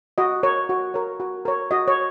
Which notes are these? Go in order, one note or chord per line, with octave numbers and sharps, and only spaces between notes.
F#4 D#5
A#4 C#5
F#4
A#4 C#5
F#4
A#4 C#5
F#4 D#5
C#5